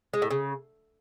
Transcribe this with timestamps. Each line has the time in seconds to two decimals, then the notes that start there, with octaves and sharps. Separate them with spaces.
0.13 G#3
0.22 A2
0.30 C#3